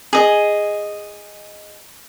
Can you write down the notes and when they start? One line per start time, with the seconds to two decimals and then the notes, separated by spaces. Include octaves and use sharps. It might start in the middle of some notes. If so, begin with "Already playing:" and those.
0.13 G#4 D#5